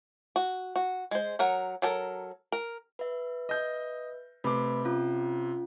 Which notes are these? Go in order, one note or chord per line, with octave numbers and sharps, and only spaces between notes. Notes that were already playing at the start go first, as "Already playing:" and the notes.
F#4
F#4
G#3 C5
F#3 A#4 F#5
F#3 A4 A#4
A#4
B4 E5
D#5 G6
C3 A3 B4 B5 D6
C#4 F4